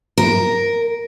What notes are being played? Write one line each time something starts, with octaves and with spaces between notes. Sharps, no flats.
A#4